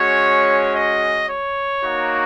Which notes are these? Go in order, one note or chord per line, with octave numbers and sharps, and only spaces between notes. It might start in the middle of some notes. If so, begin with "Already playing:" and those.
Already playing: G#3 C#4 F#4 C#5
D#5
C#5
A#3 D#4 F#4